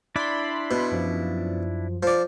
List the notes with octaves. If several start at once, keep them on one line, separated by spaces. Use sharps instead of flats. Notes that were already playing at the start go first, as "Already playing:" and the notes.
D4 E4 D5 B5 C6
B2
F#2 F3
F3 D5